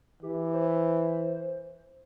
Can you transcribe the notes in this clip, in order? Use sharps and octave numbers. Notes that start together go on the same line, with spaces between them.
E3 G4
C5